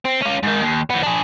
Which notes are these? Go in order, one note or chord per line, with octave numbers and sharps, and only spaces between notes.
C4
C#4 F4
G#2 D#3
D#2
D#3 B3
D4 G#4